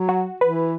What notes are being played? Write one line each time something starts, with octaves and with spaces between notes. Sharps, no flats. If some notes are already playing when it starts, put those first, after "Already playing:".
Already playing: F#3
F#4
E3 B4